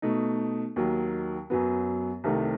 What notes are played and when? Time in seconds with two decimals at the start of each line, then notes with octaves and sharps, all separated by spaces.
0.02 B2 A3 D#4
0.76 D#2 D#3 F#3
1.50 F#2 F#3 B3
2.24 C2 C3 D#3 A3